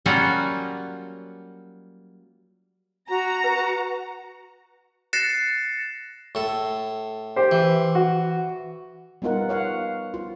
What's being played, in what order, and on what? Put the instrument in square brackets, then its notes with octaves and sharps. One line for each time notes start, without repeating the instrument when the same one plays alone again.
[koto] F#3 G3 A#3 C#4 F4 F#4
[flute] F#4 [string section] A#5
[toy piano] B4
[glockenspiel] F#6 A6 A#6 C7 C#7 E7
[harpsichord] A2 A4
[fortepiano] G4 C5
[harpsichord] E3
[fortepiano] F#4
[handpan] G3 B3 D#4 F4 A#4 F#5
C#5 F5 F#5
F4